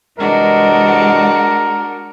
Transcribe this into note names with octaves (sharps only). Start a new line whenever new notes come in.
C2 E3 G#3 D4 F#4 A#4 D#5